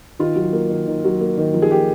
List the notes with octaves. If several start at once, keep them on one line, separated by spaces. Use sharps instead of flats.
D#3 F4
F#3
A#3
D#3
D#3
F#3
A#3
D#3
F3
G#4
A#3 G4